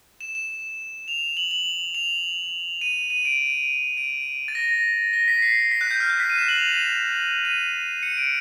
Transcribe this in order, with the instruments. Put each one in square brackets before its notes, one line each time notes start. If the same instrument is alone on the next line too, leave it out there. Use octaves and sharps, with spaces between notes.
[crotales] E7
E7
F7
F#7
F#7
F7
D#7
D#7
D7
D7
A6
A#6
A#6
B6
C7
B6
F#6
G6
F6
F#6
B6
D#7
E7
F#7
F7
D#7
D#7
C#7
D7